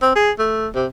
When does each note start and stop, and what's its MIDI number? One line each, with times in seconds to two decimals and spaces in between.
0.02 0.13 60
0.16 0.31 68
0.39 0.68 57
0.75 0.86 48